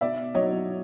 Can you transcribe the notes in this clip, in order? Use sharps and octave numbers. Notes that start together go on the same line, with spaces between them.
B2 D5 E5
F#3 C#5 D#5